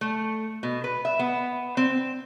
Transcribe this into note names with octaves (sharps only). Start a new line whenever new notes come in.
A3
B2
B4
E5
B3
C4